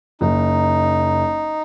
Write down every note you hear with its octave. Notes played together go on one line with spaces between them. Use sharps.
F#1 D#4